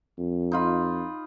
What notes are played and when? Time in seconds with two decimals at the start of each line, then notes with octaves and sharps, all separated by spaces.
0.19 F2
0.52 D#4 F4 B5